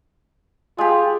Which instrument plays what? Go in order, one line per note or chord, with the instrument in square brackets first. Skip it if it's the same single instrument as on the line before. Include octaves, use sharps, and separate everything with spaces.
[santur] G#3 G4 [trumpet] F4